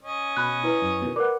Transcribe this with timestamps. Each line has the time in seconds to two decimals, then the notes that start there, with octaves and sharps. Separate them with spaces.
0.03 C#4 D#5
0.37 B2 B5 F#6
0.63 E4 B4
0.82 F#2
1.02 B2 D#3
1.16 A#4 B4 D5 F#5 D6